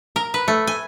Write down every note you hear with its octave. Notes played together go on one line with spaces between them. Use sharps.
A#4
B4
A3
G#5